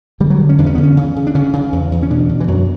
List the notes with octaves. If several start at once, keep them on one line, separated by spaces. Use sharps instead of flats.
D3 G3
F#3
D3
C#4
E2 D4
C#4
D3 B3
C#4
C#3
C#3
D4
C#3 C#4
C#3
E2
E2
C#4
B2 D4
B2
E3
F#2 F#3